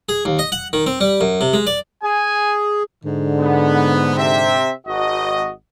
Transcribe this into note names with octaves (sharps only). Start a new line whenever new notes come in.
G#4
D#2
D#5
F#5
D#3
C4
G3
F#2
C3
G#3
D5
G#4 G#5
G#2 D3
B3
C3 C4 E5
G#1 F#4 D#5